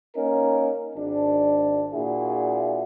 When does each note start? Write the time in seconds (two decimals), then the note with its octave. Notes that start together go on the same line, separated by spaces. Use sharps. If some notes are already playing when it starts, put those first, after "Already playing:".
0.16 A#3 C#4 D#4 A#4
0.96 G#1 D4
1.94 A#2 D4 E4 F#4 G#4